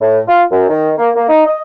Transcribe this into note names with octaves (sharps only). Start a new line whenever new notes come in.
A2
F4
F#2
D#3
A#3
A#3
D#4
D#5